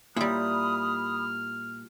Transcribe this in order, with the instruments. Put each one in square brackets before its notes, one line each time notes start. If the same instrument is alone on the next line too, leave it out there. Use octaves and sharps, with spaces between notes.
[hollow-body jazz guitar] A#2 [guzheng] G3 E4 [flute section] B5 D#6 [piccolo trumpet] F6